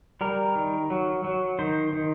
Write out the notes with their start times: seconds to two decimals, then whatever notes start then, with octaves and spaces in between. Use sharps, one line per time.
0.21 G3 A#4
0.56 D#3
0.90 F#3
1.24 F#3
1.59 D#3 C5
1.93 D#3